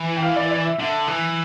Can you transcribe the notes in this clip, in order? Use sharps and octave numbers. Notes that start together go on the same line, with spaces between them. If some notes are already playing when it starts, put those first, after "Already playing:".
Already playing: E3
G5
F5
D5
D5
E5
D3 E5
E3